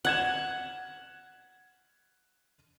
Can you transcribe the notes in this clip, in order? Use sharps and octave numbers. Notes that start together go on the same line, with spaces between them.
F#5 F#6 G#6 E7